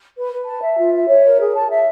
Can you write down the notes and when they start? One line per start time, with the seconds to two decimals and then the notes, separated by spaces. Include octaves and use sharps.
0.16 B4
0.32 B4
0.46 A5
0.62 E5
0.78 F4
0.93 E5
1.08 C#5
1.24 A#4
1.39 G#4
1.54 A5
1.69 E5